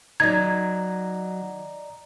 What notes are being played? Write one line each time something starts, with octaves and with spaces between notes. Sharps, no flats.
D#3 F#3 D5 D#5 A#5 G#6